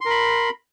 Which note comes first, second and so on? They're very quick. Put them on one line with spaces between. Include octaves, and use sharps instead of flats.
C6 A#4 B5